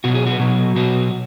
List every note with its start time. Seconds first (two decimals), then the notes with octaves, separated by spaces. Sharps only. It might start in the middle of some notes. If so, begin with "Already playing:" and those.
0.04 B2 F#3 F#4
0.15 G#4
0.27 F#4
0.40 B2 F#3
0.76 B2 F#3 F#4